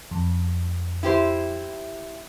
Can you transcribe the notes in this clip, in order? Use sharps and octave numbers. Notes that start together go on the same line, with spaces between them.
F2
E4 G4 C5